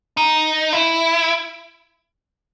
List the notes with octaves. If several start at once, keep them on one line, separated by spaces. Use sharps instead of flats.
D#4
E4